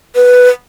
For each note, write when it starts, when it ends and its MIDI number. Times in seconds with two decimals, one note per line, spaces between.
0.16 0.49 71